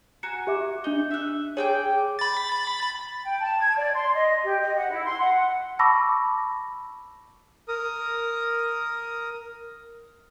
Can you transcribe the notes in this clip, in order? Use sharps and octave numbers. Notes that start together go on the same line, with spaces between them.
F#4 G#5 A#5 C#7
G4 E5 D6
D4 D#4 G7
E5 F#6
G#4 C#5 G5 D6
B5 A6
G5
A5
G#6
D5
C6
D#5
G4
D#5
F#5
E4
C6
F#5
A5 B5 C#6 D6 E6 A#6
A#4 D#6